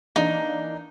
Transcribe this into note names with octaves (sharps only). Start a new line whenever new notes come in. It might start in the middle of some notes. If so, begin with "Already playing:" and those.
E3 A#3 D4 D#4